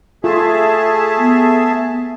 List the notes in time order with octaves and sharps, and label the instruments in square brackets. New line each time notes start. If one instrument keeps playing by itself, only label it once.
[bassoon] A3 [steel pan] F4 [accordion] G#4 E5 A5
[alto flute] B3